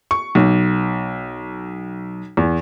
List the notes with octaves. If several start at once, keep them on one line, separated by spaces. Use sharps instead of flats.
C#6
B1
E2